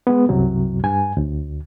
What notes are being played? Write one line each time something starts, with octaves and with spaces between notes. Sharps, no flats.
G#3 B3
C2 F#2 C3 F#3
G2 G#5
D2